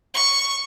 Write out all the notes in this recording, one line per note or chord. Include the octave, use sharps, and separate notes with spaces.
C#6